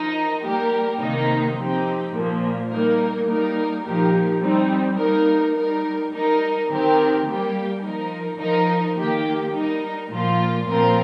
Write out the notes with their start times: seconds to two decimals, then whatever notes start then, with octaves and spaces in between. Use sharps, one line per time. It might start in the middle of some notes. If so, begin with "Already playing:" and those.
Already playing: F3 D#4 A#4
0.42 G3 A#3 G4 A#4
0.99 C3 D#3 A#3 D#4
1.56 F3 C4 D#4 G4
2.13 A#2 F3 A#3
2.70 G3 A#3 D#4 A#4
3.27 G3 A#3 D#4 A#4
3.84 A#2 F3 D#4 G4 A#4
4.41 G3 C4 D#4
4.97 G3 A#3 D#4 A#4
5.55 G3 D#4 A#4
6.11 G3 D#4 A#4
6.69 D#3 C4 D#4 G4 A#4
7.25 G3 A#3 G4
7.82 F3 D#4 A#4
8.39 F3 D#4 A#4
8.96 D#3 A#3 G4
9.52 G3 D#4 A#4
10.10 A#2 F3 A#3 F4
10.67 A#2 F3 C4 F4 A#4